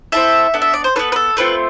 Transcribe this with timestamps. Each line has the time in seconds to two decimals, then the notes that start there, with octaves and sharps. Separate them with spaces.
0.12 C4 E4 A4 E5
0.54 B3 D4 A4
0.62 E5
0.73 D5
0.84 C5
0.96 D4 A4 B4
0.99 B3
1.12 B4
1.16 A4
1.37 A3 C4 F4 B4